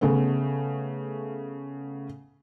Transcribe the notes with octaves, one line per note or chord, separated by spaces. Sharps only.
C#3 A3 B3 C#4